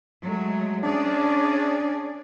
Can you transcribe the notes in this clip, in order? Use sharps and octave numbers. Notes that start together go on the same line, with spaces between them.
F#3 G#3 A3
C#4 D4 G#4 D5